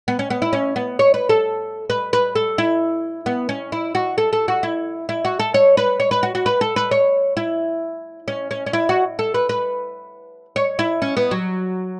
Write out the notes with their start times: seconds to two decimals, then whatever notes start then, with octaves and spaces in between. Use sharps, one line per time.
0.08 B3
0.19 C#4
0.30 B3
0.42 E4
0.53 C#4
0.76 B3
0.99 C#5
1.14 B4
1.29 A4
1.90 B4
2.13 B4
2.35 A4
2.58 E4
3.26 B3
3.49 C#4
3.72 E4
3.95 F#4
4.18 A4
4.33 A4
4.48 F#4
4.63 E4
5.09 E4
5.25 F#4
5.40 A4
5.54 C#5
5.77 B4
6.00 C#5
6.11 B4
6.23 F#4
6.35 F#4
6.46 B4
6.61 A4
6.76 B4
6.91 C#5
7.37 E4
8.28 C#4
8.51 C#4
8.66 C#4
8.73 E4
8.89 F#4
9.19 A4
9.34 B4
9.49 B4
10.56 C#5
10.79 E4
11.02 C#4
11.17 B3
11.31 F#3